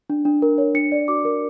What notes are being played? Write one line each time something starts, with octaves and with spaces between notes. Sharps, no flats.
D4
D4
A#4
C#5
D4 C#7
D5
F#4 D6
A#4